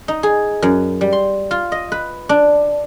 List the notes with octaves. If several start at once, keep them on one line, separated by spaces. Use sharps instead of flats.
D#4
G#4
F#2
G3
C6
F4
D#5
B4
D4